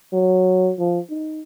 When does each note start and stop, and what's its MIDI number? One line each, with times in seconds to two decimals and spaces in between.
0.13 0.73 54
0.79 0.99 53
1.10 1.42 63